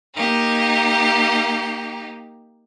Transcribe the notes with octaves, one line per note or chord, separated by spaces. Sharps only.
A#3 D#4 G4